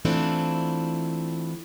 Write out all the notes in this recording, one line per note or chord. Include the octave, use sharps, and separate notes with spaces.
E3 A3 C4 D4 E4 F4